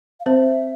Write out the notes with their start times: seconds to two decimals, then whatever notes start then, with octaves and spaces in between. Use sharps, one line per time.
0.20 F5
0.26 C4 C5 E5